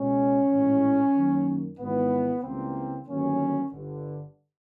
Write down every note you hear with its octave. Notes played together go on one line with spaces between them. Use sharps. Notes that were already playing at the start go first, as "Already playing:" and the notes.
Already playing: C#2 B2 G#3 C#4
A#1 A2 E3 G#3
F#2 D#3 F#3 A#3
G#1 G#2 E3 B3
C#2 C#3 E3 G3 A#3 C4
G1 G2 D#3 F#3 A#3 C#4
G1 G2 D3